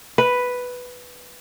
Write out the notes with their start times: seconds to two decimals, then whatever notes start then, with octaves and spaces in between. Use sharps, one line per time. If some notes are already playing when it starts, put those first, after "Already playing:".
0.18 B4